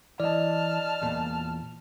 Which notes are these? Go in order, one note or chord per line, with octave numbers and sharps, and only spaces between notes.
E3 D5 D#5 A5 F6
E2 A#2